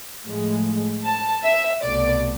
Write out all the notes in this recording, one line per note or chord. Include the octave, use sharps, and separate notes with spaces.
A2 F3 G#3
A5
E5
C2 B2 A3 D5